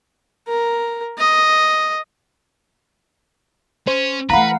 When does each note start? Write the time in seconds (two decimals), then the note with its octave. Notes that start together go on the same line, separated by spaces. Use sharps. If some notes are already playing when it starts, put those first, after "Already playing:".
0.48 A#4
1.19 D#5
3.87 C#4 C5
4.30 E3 A3 B4 F5 F#5 A#5 B5